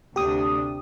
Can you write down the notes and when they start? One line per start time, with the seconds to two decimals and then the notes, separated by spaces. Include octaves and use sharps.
0.16 D2 C3 D4 G4 D#6